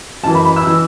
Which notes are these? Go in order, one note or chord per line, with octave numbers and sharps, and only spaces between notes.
F#2 E3 A5
B5
B5
E6
E3